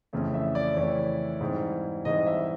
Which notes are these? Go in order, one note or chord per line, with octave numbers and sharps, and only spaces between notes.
F2 C#3 E3 A3 C#4
E5
D5
F2 C#3 E3 A3 C#4 C#5
G#2 E3 G3 C4
G#2 E3 G3 C4 D#5
E5